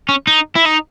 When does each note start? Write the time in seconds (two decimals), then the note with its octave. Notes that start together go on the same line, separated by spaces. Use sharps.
0.09 C#4
0.27 D#4
0.56 E4
0.66 D#4